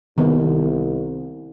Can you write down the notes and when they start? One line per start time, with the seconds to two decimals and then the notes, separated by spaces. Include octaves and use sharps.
0.18 C2 D#3 B3